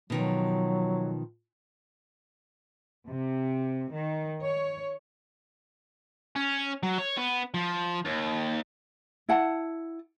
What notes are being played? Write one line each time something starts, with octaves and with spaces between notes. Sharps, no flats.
B2 D#3 F3 F#3
C3
D#3
C#5
C#4
F#3
C#5
B3
F3
D#2
E4 F#5 A5